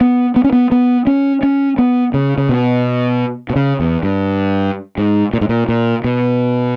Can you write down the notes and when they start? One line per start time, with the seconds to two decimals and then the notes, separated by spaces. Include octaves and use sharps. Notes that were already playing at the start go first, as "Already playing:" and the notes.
0.01 B3
0.36 B3
0.44 C#4
0.53 B3
0.72 B3
1.07 C#4
1.43 C#4
1.79 B3
2.14 C#3
2.38 C#3
2.49 B2
3.50 B2
3.56 C#3
3.80 E2
4.03 G2
4.98 G#2
5.34 A#2
5.41 G#2
5.49 A#2
5.69 A#2
6.04 B2